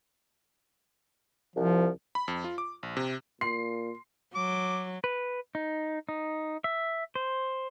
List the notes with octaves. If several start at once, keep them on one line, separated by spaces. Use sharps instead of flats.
C2 F3
B5
F2
F4
D6
A#1
C3
A#2 C6 C7
F#3 D6
B4
D#4
D#4
E5
C5